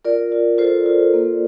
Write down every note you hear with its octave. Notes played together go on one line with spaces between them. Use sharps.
F4 A#4 D5
F4
F4 A4 C5
F4
A#3